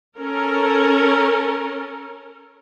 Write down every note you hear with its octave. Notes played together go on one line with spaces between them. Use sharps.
C#4 A4 A#4